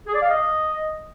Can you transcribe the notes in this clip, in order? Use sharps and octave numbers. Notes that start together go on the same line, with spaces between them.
G#4
D5
F5
D#5